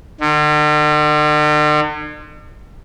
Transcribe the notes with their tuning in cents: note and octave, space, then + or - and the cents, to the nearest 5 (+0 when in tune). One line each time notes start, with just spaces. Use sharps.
D3 +45